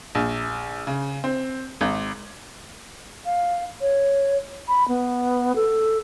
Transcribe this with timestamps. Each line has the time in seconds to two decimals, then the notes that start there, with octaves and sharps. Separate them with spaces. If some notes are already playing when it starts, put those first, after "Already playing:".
0.15 A#1
0.87 C#3
1.24 C4
1.81 G#1
3.26 F5
3.81 C#5
4.68 B5
4.88 B3
5.56 A4